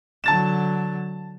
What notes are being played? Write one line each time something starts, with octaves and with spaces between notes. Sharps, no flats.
D3 F#3 A5 A6 E7